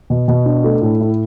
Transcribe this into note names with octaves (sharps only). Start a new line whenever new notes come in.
B2
B2
D4
A3
A2
E4